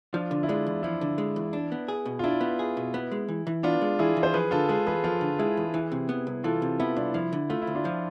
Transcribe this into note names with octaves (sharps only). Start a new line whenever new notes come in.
F3 D4 F4
D3
E4
G#3 D4
E2
F3 E4
D3
G#3
E2
D4
B3
G#4
B2
F4
D4 E4
B3
G#4
B2
B3
G#3
E3
E3
B3 D4 F4
G#3
E3 E4 G#4
E3
C5
F3 G#4 B4
D3 F4 A4
G#3 G#4 B4
E2 G#4 B4
F3 F4 A4
D3
G#3 E4 G#4
E2
E3
C3
B3
C2
E3 F4 A4
C3
B3 E4
C2 D4 F4
F3 E4
D3
A3 F4
E4
D2
D4 F4
F3